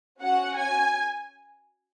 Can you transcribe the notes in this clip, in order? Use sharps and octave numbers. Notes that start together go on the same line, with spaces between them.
C#4 F#4 F#5
G#5